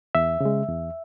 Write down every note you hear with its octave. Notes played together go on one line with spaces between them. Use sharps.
E2 E5
C#3 G#3
E2